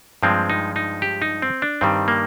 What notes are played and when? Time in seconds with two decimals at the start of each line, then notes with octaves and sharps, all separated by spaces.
0.23 G2 F3 G#3 C4
0.50 D#4
0.76 D#4
1.02 G4
1.22 D#4
1.42 C4
1.62 D4
1.81 G2 D#3 G3 C4
2.08 A#3